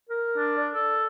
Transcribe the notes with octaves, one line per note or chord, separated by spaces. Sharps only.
A#4
D4
D5
A4